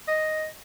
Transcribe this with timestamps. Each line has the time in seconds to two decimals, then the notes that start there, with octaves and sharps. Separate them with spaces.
0.08 D#5